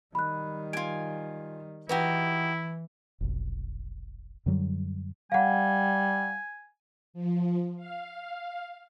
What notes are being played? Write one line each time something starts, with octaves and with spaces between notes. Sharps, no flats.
D#3 G3 B5 F#6
F4 G#5 G#6 D7
E3 D#4 E4 F#4 G4 B4
F1 B1
F#2 D3 F#3 G3
G3 F5 F#5 G#5
F3
F5